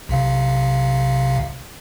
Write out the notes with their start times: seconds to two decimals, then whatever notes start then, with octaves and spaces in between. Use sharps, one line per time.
0.09 B1 C3 F5